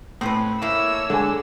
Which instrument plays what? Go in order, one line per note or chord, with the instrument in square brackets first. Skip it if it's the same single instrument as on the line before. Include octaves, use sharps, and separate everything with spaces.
[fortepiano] A2 [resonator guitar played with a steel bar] C4 C#4 B4
[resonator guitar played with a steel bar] A3 A#3 [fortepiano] E4 [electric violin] C#5 E6
[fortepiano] D3 [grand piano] G#3 G#5